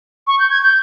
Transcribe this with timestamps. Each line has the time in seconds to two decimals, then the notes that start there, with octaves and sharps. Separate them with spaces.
0.27 C#6
0.39 G6
0.50 G#6
0.63 G6